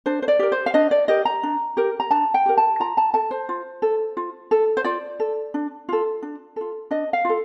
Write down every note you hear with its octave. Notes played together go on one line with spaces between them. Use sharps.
D4 C5
C5
D5
G4 A#4
C5
F5
D4 D#5
D5
G4 A#4 D#5
A#5
D4
G4 A#4
A#5
D4 A5
G5
G4 A#4
A5
F4 A#5
A5
A4 A5
C5
F4
A4
F4
A4
C5
F4 D5
A4
D4
F4 A4
D4
F4 A4
D4 D#5
F5
F4 A4